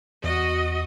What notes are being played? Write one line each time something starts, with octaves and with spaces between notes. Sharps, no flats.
E2 F#4 D#5